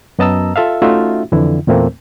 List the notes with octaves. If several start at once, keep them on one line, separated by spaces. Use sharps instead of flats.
F#2 B3 D#5 A5 A#5 E6
F4 A4 E5 F5
A3 C#4 D#4 F4 F#4 E5
F2 D3 E3 E4
E2 A#2 A3 A#3 C4